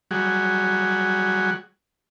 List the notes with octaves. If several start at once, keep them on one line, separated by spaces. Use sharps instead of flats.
F#3 G3 F#4 G#4